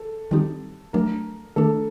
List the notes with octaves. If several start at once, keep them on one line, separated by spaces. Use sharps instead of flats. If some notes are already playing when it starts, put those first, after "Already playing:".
Already playing: A4
D#3 G3 C4 D#4 G4
F#3 A3 D4 A#4
D#3 A3 D4 A4